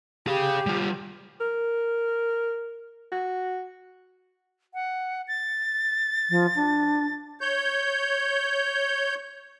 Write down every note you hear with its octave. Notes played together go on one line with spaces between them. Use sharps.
G4 G#4 F5
G3 F4
A#4
F#4
F#5
A6
F3
D4
C#5 G6